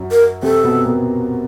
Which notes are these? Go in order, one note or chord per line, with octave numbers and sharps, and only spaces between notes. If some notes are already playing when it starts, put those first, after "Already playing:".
Already playing: F#2 F#3
A#4
C3 C4 A4
B2 B3
A#2 A#3